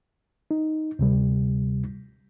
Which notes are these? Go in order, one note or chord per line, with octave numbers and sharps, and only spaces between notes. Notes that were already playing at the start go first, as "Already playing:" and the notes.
D#4
D2 C3 G3